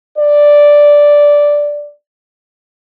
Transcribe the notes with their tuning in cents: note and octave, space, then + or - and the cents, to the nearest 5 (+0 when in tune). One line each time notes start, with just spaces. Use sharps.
D5 -5